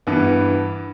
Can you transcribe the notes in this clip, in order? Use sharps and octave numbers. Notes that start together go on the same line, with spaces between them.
G2 E3 B3